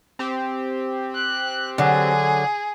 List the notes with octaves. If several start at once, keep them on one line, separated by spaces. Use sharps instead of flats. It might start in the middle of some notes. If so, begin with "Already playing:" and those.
C4 G4
F#6
D3 F#3 G#4